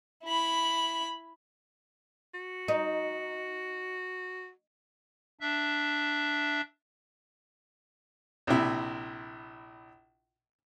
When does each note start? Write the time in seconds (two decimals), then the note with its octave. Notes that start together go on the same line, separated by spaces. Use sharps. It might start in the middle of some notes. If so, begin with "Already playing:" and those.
0.24 E4 B5
2.34 F#4
2.68 D#4
5.41 D4 E5
8.47 A#1 C3 E4